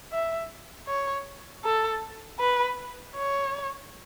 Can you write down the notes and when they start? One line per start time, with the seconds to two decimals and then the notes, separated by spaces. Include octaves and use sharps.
0.12 E5
0.88 C#5
1.64 A4
2.40 B4
3.16 C#5